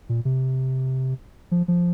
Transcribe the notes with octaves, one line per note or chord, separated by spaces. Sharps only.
A#2
C3
F3
F3